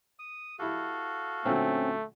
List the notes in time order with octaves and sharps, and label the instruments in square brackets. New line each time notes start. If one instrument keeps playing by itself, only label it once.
[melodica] D#6
[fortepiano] E4 G4 [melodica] F#4 A4 F5
[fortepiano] A#2 D3 F#3 [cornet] A3 [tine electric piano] C4 C#4